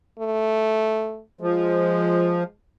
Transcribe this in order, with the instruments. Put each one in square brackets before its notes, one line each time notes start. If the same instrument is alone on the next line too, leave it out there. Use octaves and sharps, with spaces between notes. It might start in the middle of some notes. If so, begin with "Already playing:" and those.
[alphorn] A3
[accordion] F3 [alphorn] G#3